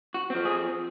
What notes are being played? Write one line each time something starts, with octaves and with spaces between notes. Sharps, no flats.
F#4
F3 C4
G#4